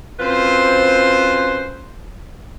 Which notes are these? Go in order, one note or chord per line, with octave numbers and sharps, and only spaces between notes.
F#2 C4 F4 B4 C5